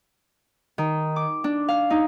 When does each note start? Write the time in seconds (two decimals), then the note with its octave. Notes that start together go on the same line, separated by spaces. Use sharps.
0.78 D#3
1.16 D6
1.44 D4
1.69 F5
1.90 D#4